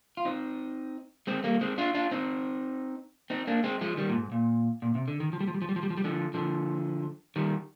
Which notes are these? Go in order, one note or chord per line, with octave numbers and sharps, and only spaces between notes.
F4
C4 D#4
G#3 C4
G3 A#3
G#3 C4
D4 F4
D4 F4
C4 D#4
C4 D#4
A#3 D4
G#3 C4
F3 G#3
D#3 G3
A#2
G#2
A#2
A#2
C3
D3
D#3
F3
G3
F3
G3
F3
G3
F3
G3
F3
G3
D3 F3
D3 F3
D#3 G3